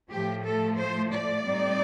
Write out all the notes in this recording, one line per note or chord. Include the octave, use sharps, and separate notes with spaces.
A2 F3 A3 G4
A4
C5
D5
A2 G3 C4 D#4